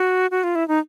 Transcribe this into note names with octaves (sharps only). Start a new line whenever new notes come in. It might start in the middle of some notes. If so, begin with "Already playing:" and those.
Already playing: F#4
F#4
F4
E4
D#4